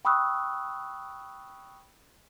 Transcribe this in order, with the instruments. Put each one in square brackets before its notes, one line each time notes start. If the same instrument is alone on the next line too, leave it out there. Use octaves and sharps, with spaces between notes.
[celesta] G5 B5 C#6 D#6 E6 F#6